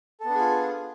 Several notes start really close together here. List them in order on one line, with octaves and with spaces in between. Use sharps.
A4 B3 D4 G#4 F4